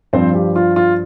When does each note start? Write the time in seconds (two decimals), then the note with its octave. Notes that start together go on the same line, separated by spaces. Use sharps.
0.13 G2 F3 C4 C5
0.35 G4
0.56 F4
0.76 F4